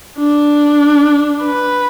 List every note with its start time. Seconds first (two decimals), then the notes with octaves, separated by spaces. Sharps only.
0.18 D4
1.44 B4